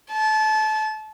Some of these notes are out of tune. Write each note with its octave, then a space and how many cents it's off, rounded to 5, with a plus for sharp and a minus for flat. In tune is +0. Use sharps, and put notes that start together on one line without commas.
A5 -25